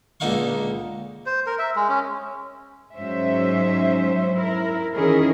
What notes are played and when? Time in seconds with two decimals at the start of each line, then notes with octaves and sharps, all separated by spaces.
0.20 C#2 A#2 D3 D#4 F5 C#6
1.26 C5
1.46 A#4
1.59 E5
1.76 G#3
1.89 C#4
2.95 G#2 F#3 C#4 C5 E5
4.35 E4 A#4
4.94 D#3 E3 C#4 E4 G#4 A#4